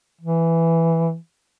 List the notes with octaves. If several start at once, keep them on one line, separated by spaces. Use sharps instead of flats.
E3